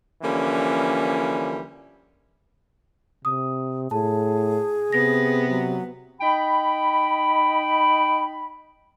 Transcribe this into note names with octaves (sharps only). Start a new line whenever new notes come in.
D3 E3 F3 G3 A#3 C#4
C3 D#6
A2 G#4 A5
C3 B3 A#6
F#3
D#4 G5 B5